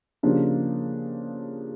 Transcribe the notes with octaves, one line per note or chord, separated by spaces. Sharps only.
C#3 F3 A#3 D4 G4